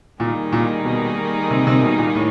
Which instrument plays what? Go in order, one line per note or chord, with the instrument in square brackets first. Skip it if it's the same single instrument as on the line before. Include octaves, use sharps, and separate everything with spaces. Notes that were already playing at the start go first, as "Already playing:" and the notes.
[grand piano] A#2 [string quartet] D#3 G3 A#3 D#4 G#4
[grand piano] A#2
B2
C3
C3
B2
A#2
A2